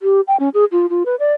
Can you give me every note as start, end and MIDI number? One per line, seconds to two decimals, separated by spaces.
0.02 0.21 67
0.28 0.36 79
0.40 0.49 61
0.54 0.65 68
0.72 0.86 65
0.90 1.03 65
1.06 1.15 71
1.20 1.33 74